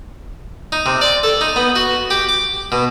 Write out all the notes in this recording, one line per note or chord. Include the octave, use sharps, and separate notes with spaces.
D#4
C3
D5
A4
D#4
B3
F#4
G4
D6
B2